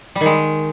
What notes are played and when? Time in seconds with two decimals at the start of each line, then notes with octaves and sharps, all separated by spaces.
0.15 G3
0.21 D#3
0.26 G#3